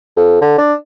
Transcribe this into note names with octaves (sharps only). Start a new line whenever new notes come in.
F2
D3
D4